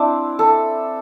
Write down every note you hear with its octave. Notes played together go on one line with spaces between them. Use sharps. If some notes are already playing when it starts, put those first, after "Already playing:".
Already playing: C4 D4 E4
A4